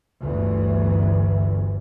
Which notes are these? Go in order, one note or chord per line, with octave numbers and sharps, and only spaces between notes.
G1 D2 E3